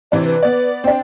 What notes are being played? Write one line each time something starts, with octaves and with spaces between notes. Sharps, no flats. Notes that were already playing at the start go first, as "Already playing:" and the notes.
C3 E3 D4 D5
B4
B3 D5
C4 D4 G5